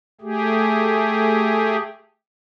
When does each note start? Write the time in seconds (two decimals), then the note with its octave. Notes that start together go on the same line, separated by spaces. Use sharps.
0.21 A3 G4 G#4